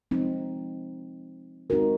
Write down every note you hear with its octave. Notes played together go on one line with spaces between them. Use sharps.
F3 G#3 C4 D#4
G#3 C4 D#4 F#4 A#4